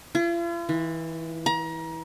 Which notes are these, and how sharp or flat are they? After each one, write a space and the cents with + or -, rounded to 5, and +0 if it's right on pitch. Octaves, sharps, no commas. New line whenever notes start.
F4 -45
E3 -20
A#5 +30